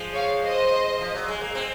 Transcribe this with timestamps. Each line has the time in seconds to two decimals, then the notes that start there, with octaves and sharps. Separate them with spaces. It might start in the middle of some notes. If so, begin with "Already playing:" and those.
Already playing: F3 G#3
0.15 C#5 F5
0.43 C5 D#5
1.01 F3
1.15 F#3
1.28 G#3
1.41 A#3
1.55 G#3 C4